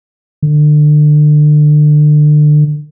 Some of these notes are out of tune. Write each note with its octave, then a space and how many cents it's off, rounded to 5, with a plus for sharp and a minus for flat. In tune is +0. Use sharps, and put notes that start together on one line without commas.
D3 +30